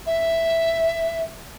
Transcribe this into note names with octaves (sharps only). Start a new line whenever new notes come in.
E5